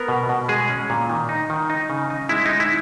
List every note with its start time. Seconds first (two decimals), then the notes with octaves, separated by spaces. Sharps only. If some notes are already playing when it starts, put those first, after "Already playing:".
Already playing: B3 A#4
0.09 B2
0.29 B2
0.49 G#3 G#4
0.69 C#4
0.90 A#2
1.10 D#3
1.29 D#4
1.50 D#3
1.70 D#4
1.90 C#3
2.10 D#4
2.29 G#3 E4
2.46 G#3 D#4
2.60 E4